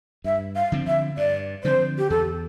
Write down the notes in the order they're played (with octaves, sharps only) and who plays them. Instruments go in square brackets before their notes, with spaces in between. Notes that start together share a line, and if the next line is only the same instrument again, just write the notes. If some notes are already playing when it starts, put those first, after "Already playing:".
[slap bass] G2 [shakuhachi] E5
[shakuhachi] F5
[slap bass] D3 F3 C4
[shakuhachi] E5
[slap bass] G2 [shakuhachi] D5
[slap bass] D3 F3 C4 [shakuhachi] C5
[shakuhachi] G4
[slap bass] E2 [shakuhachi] A4